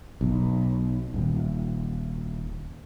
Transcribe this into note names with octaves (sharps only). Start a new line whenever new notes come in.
B1
D#1